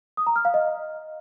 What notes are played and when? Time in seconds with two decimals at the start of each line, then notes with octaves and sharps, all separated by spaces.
0.17 D#6
0.27 A#5
0.36 F6
0.45 F5
0.54 D#5